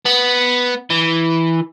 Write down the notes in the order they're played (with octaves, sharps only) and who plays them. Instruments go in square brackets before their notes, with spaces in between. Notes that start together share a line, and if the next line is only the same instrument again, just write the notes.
[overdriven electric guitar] B3
E3